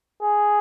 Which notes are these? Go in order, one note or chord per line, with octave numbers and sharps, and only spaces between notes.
G#4